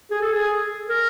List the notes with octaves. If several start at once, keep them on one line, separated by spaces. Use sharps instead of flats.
G#4
A4
G#4
A#4